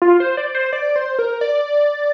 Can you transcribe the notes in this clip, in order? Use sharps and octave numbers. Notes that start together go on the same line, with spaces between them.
F4
C5
D5
C5
D5
C5
A#4
D5